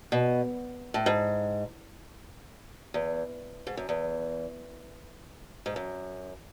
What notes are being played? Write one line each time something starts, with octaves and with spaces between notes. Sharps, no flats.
B2
A2
G#2
E2
G#2
F#2
E2
G#2
F#2